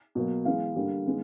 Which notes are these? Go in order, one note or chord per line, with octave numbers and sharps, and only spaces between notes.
B2 F#3 A#3
E3 G#3 B3 F5
D3 G3 A#3
D#3 G#3 B3